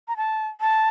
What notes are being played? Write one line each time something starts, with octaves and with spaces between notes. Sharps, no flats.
A#5
A5
A5